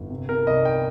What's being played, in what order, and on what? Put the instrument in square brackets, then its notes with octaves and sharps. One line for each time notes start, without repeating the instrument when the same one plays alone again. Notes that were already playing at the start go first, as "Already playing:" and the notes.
Already playing: [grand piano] G1
C3
C3 A#4
C2 D#5
G5